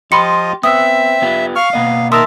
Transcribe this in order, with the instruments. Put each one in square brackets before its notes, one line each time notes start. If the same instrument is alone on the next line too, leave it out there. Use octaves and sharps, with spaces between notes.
[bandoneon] F3 F4 D#5 [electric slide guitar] G4 [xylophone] B5 C6 C#7
[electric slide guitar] B3 [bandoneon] C4 [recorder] E5 [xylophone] D#6 E6
[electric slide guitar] B3 F4 G4
[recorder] F5 [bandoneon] C#6 F6
[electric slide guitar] B2 A#3 D#5 [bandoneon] B3
[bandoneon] D#3 E5 A5 [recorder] A#4 [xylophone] C6 D#6 E6